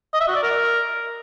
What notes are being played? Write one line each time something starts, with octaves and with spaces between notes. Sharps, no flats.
D#5
E5
F#4
D5
A#4